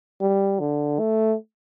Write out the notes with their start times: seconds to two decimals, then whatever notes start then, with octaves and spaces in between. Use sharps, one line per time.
0.21 G3
0.60 D3
0.99 A3